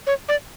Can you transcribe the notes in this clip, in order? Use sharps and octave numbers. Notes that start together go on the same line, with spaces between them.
C#5
D5